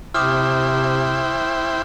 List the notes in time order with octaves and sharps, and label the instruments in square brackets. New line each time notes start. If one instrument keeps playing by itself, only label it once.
[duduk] C3 [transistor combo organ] E4 C5 G5 [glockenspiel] D6 D#6 F6